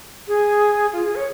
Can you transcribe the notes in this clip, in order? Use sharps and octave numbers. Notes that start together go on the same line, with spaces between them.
G#4
F4
G#4
C#5